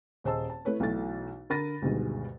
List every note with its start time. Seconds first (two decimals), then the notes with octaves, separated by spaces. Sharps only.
0.24 D#1 G#4 C5 D#5 A5 E6
0.50 A5
0.65 A3 E4 B4 C#5
0.80 B1 B2 E3 A3 A6
1.50 D3 A#4 B5 A6 A#6 D#7
1.82 D2 G2 B2 D#3 G#3